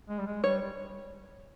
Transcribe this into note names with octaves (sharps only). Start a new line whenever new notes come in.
G#3
G3
G#3
G3 C#5
G3